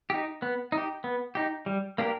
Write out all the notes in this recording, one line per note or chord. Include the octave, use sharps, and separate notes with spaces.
D#4 G4
B3
D#4 G4
B3
D#4 G4
G3
A#3 D4 G4 A#4